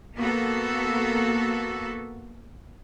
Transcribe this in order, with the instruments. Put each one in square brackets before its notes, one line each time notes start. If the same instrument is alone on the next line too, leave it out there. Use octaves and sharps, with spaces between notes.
[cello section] A#3 B3 F#4 A4